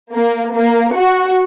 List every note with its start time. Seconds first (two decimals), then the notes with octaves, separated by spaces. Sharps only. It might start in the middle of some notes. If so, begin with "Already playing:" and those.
0.13 A#3
0.54 A#3
0.95 F#4